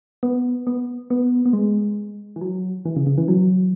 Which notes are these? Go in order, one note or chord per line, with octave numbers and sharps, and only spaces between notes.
B3
B3
B3
B3
G#3
E3
F#3
E3
C#3
C#3
E3
F#3